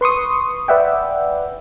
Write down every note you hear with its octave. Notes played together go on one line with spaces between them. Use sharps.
B4 C6 C#6 D#6
B4 D5 E5 F#5 G5